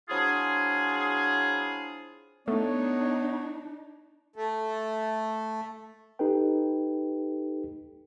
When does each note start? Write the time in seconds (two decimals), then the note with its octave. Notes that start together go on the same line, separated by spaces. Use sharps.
0.09 F#3 C4 D4 E4 F4 G#4
2.48 A3 B3 D4 D#4 C#5
4.36 A3
6.19 D#4 G4 A4 B4 G5